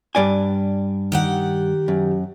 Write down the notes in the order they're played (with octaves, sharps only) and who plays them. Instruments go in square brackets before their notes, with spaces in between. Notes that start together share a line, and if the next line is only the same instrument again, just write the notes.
[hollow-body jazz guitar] G2 D5 G#5
[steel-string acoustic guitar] D#3 G4 F#5
[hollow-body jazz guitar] F#2